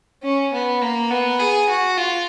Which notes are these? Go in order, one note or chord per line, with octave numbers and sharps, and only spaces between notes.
C#4
B3
A#3
B3
G#4
F#4
F4